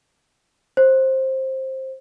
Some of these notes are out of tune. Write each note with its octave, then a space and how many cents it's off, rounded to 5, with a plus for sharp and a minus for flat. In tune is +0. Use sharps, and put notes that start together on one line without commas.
C5 +15